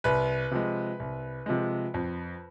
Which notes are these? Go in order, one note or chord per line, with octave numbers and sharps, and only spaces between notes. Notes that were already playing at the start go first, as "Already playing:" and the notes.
C2 B4
C3 F3 G#3
C2
C3 F3 G#3
F2